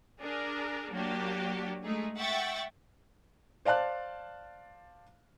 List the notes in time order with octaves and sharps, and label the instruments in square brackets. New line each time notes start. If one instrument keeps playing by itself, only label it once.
[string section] D4 G#4 A#4
F#3 A#3 D4 F#4 G4
G#3 A3 D#4 G#4
E5 F#5 G5 C#6 A6
[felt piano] C5 D5 F5 A5 F#6